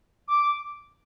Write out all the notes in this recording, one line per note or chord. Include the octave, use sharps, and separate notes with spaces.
D6